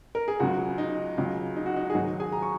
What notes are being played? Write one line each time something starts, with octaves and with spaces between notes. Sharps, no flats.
A#4
G#4
C#2 C#3 F#3 F#4
D#4
C#2 C#3 F#3
D#4
F#4
D#4
G#4
G#2 D#3 F#3 F#4
G#4 G#5
A#5
C#6